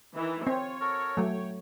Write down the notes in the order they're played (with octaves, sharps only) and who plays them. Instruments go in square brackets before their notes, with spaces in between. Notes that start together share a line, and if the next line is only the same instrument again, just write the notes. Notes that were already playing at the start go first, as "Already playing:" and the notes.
[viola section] D#3 E3
[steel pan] C4 [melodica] F4 [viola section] C#5
[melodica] F#4 A4 A#4
[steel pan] F#3 A3 [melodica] G5